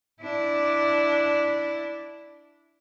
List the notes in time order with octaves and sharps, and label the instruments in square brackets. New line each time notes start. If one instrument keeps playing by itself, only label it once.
[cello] D4 E4